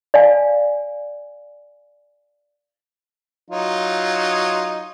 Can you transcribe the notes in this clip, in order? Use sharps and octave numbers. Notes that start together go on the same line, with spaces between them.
D5 F5 G#5
F#3 D#4 F4